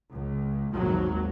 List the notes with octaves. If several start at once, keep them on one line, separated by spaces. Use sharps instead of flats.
C#2
G#1 D#2 F#3